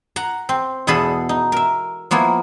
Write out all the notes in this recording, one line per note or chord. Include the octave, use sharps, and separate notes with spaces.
F#5 A#5
C4
E2 B2 B3 G#4 A4 B5
D#4
A#4 E5
F3 A#3 B3 E4